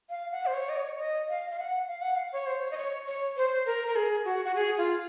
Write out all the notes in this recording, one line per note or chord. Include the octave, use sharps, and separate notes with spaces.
F5
F#5
C5
C#5
D#5
C#5
D#5
F5
F5
F#5
F5
F#5
F5
C#5
C5
C#5
D#5
C#5
C#5
C5
A#4
A#4
G#4
F#4
F#4
G#4
F4